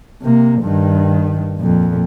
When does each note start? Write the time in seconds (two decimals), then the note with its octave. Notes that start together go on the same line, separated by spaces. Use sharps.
0.21 C3 A#3
0.60 G2 D#3
1.59 F2 A#2